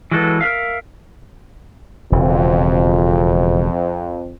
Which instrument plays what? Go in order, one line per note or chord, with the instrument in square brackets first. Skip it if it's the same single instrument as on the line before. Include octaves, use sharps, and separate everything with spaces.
[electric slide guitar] E3 F#3 G#3 F#4 A4 B4
A#4 B4 E5 F5
[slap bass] E1 C#3 [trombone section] F2